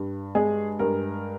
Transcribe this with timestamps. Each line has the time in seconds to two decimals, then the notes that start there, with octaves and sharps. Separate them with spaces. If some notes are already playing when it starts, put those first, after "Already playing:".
Already playing: G2
0.35 G#3 G#4
0.79 G2 A#4